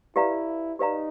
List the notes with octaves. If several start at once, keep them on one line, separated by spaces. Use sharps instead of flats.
E4 G4 B4 D5 F5 A#5
D#4 G4 B4 D5 F5 A#5